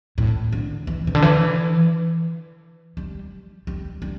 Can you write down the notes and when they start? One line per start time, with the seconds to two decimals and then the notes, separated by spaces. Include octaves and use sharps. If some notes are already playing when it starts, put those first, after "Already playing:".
0.18 A2
0.52 D3
0.87 E3
1.07 C3
1.15 D3
1.22 E3
2.97 G3
3.67 G3
4.02 G3